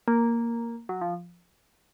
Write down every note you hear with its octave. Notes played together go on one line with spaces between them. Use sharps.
A#3
F#3
F3